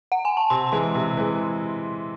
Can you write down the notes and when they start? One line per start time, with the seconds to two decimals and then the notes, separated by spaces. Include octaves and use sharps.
0.12 F#5
0.25 G#5
0.37 A5
0.50 C3 C6
0.72 E3 G#3 C6
0.94 C3 C6
1.17 E3 G#3